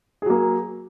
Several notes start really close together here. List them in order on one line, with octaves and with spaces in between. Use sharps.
G#4 F#3 A#3